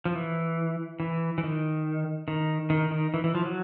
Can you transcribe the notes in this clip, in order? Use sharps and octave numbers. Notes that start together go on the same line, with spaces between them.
F3
E3
E3
E3
D#3
D#3
D#3
D#3
E3
E3
F3
F#3